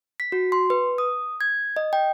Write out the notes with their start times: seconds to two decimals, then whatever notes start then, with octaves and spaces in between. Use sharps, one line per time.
0.20 B6
0.32 F#4
0.52 C6
0.70 B4
0.98 D#6
1.41 G#6
1.77 D#5
1.93 G5